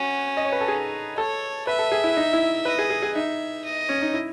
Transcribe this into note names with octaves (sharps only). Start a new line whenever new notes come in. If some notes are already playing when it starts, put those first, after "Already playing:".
Already playing: C#4 F#4
D#5
C#5
B4
A4
D#4 G#4
A4 C#5
B4 E5
A4
G#4
E4
D#4
E4
B4 D#5
G#4
G#4
G#4
D#4 E5
D#5
C#4
D#4
E4